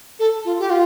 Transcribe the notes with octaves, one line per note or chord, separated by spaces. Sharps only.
A4
F4
G4
F4